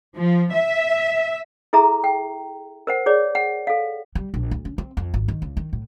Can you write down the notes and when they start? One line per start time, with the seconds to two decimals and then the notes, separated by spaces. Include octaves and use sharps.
0.16 F3
0.53 E5
1.73 E4 G#4 A4 E5 A#5
2.04 G5
2.87 A#4 C5 F#5
3.06 G#4 C#5 D5
3.35 F#5
3.67 A4 F5
4.15 G3
4.34 A#1
4.51 D2
4.65 C#4
4.78 C4
4.97 F2
5.14 G#1
5.28 D#3
5.42 C#2
5.57 D#3
5.73 A2